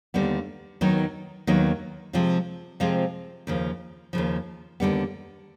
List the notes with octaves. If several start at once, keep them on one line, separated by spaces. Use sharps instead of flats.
D#2 D3 G3 B3
D#2 D#3 F#3 B3 D#4
D#2 D#3 F#3 B3 D#4
C3 F3 G#3 C4 F4
C3 F3 G#3 C4 F4
D#2 C#3 F3
D#2 C#3 F3
D#2 D3 G3 B3